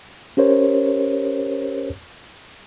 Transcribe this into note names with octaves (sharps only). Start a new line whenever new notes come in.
C#4 G4 A#4 C5 C#5